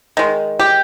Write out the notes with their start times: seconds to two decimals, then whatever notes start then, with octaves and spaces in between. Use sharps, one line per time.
0.17 D#3 G#3
0.60 G4